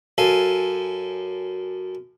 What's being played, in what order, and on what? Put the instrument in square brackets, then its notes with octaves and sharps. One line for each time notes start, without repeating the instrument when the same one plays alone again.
[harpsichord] F#2 A4 F5 G#5